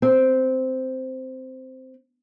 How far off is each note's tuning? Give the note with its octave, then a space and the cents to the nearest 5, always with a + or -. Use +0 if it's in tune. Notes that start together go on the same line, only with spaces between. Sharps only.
C4 -10